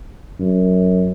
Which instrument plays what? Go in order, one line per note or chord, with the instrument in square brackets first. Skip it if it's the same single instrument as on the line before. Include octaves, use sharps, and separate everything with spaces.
[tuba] F#2